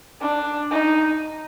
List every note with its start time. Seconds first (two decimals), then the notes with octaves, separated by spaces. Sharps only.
0.21 D4
0.71 D#4